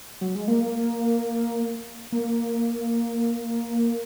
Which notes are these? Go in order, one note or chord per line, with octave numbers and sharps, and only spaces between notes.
F#3
G#3
A#3
A#3